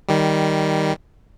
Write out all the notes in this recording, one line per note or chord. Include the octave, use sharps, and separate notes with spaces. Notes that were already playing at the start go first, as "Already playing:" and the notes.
D#3 G3